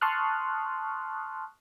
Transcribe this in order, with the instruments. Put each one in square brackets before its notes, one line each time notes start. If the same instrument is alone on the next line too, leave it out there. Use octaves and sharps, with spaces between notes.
[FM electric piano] A5 C6 C#6 D#6 F6 F#6